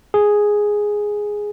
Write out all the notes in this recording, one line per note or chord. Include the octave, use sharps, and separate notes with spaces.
G#4